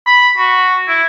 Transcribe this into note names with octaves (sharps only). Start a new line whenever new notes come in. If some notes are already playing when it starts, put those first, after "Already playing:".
B5
F#4
E4